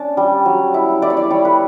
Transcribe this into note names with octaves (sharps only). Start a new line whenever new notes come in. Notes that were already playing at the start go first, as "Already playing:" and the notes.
Already playing: C#4 D4 A5
G3
F#3
E4
E4 D5
C#5
D5
G3 C#5
B4